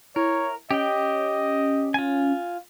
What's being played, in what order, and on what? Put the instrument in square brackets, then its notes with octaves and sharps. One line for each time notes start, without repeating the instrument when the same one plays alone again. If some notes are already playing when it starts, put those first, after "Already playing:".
[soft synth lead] E4 [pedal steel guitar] A#4 [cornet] C#5
[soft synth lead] C#4 [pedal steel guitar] G4 G5 [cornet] D#5
[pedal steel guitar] F4 G#5